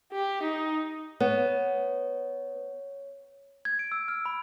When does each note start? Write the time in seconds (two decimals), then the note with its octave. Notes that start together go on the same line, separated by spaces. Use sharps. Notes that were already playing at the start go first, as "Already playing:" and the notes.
0.13 G4
0.43 D#4
1.20 B3 C#5
3.65 G#6
3.79 D7
3.92 E6
4.08 F6
4.25 B5